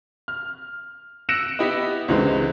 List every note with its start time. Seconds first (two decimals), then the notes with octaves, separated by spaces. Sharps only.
0.28 F6
1.29 E6 F#6 A#6 C#7 D7 E7
1.59 B3 E4 G4 B4 D#5
2.08 C#2 D3 E3 G#3 C4